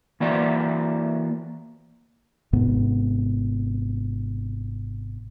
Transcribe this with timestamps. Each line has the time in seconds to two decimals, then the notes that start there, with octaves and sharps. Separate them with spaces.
0.20 E3 A#3 F#4 D5
2.53 G#1 G#2 C3 B3